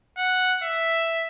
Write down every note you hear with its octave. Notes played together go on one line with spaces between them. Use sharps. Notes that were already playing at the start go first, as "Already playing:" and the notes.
F#5
E5